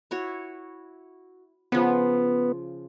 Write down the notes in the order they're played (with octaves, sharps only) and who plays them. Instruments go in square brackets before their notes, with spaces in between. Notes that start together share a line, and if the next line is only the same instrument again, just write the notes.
[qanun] E4 F#4 C#5
[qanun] C#3 F3 [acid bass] B3